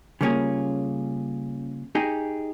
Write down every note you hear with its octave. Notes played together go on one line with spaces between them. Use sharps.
C#3 G3 A#3 C#4 F4 G#4
D#4 G4 G#4